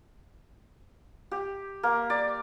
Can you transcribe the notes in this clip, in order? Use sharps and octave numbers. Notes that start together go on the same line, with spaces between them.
G4
A#3
D5